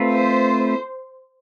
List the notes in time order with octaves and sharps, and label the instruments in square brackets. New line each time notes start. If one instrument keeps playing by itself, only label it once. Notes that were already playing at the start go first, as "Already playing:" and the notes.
Already playing: [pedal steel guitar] A3 C4 F4 B4
[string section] C5